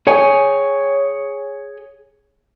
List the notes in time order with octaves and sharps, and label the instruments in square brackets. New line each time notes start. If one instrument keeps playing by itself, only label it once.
[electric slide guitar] G#4 C#5 G5 G#5